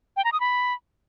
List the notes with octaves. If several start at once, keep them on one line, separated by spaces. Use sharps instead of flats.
G5
A#5
D#6
B5